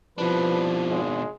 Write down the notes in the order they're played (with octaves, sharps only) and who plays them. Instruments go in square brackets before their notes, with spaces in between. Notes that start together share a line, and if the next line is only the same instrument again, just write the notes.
[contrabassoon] C2 [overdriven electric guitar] B2 D4 [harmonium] F3 [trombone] B4
[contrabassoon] G#1 [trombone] G#3